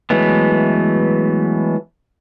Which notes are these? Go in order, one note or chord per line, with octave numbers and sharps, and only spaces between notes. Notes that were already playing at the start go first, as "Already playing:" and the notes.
E3 F#3 G#3 A3 B3